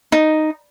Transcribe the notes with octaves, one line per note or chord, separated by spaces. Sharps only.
D#4